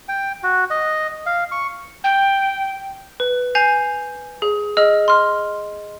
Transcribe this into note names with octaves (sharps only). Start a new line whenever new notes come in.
G5
F#4
D#5
F5
C#6
G5
B4
G#5 G6 C7 F7
G#4
G#4 D#5 E6 F6
C6 F6